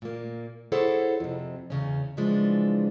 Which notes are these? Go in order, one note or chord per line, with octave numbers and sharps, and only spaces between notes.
A#2 A#3
E4 G#4 A4 C5 C#5 F#5
F2 C3
E2 C#3 C#4
C#3 E3 F3 G#3 D4